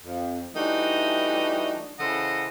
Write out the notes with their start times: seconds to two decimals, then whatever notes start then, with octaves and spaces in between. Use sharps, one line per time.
0.03 F2
0.55 E3 G3 A3 D4 D#4 F#4
1.99 C#3 E3 A4 C5 D#5 F#5